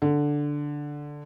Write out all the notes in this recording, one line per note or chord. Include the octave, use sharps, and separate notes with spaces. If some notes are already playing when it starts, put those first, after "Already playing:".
D3